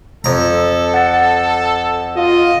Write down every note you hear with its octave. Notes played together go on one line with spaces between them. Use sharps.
F2 A4 A#5
F#5 A6
F4 D#5